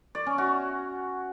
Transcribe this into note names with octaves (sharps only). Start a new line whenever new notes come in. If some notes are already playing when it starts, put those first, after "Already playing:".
D5
C#4
F#4